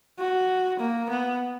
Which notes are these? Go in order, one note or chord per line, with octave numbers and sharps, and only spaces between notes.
F#4
A#3
B3